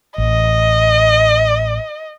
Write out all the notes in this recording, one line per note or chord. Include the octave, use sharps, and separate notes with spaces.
A1 D#5